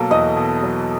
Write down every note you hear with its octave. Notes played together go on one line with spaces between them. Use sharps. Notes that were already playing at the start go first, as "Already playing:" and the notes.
Already playing: B2 F#3 A#3 A4
E2 D#5
B2
F#3